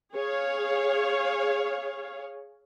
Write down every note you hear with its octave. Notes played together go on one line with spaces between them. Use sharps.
G#4 C#5 F5